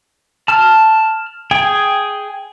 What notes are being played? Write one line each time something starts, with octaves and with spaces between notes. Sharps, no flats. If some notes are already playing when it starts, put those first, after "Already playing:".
A5 F6
G#4 G5 G#5